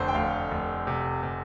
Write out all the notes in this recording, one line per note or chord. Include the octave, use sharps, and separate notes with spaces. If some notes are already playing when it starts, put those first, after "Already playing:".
Already playing: F1 D3 A4 C5
G5
F1 F5
F1
C3
C3